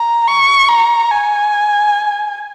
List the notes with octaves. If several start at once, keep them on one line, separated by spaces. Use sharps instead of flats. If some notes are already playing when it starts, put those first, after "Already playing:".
Already playing: A#5
C#6
A#5
G#5